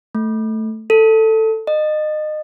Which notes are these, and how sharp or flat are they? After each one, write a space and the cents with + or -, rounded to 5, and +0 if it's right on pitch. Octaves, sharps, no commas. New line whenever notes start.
A3 +0
A4 +10
D#5 -25